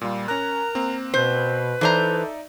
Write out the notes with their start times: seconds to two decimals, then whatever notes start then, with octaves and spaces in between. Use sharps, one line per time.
0.01 A#2 G3 F4
0.28 C#4 A#4 A#5 F#6
0.75 A#3 C4
1.14 B2 B4 C5
1.81 E3 D#4 A4 C5 D5 E5 A#5